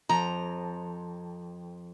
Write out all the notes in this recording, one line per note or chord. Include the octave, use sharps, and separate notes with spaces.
F2 A#5